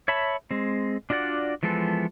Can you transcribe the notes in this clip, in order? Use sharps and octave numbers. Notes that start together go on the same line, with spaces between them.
C#5 E5 A5 B5
G#3 C4
D4 F4 F#4 D5 F#5
E3 F3 G#3 B3 A4